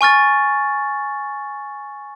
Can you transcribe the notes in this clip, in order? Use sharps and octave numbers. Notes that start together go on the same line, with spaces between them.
G#5 C#6 F6 A6